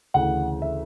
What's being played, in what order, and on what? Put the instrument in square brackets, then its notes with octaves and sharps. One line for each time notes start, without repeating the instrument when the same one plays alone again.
[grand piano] D2 C#3 E3 F#5
E5